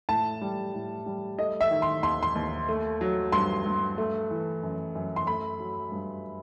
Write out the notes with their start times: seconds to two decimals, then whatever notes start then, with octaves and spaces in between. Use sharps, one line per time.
0.09 A2 A5
0.41 G3
0.74 A2
1.06 G3
1.39 A3 D#5
1.61 E5
1.70 D#3
1.82 C6
2.03 D#2 C6
2.23 C6
2.35 D#2
2.69 A3
3.01 F#3
3.32 G2 C6
3.66 G2
3.98 A3
4.30 E3
4.63 F#2
4.95 F#2
5.16 C6
5.27 A3 B5
5.60 F#3
5.92 G2